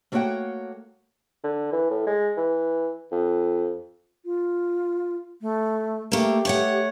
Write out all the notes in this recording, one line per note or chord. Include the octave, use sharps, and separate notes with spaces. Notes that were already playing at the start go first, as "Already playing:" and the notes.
A3 A#3 F#4 C#5 F#5 G5
D3
E3
A2
G#3
E3
F2
F4
A3
A3 A#3 G4
A3 C#5 F#5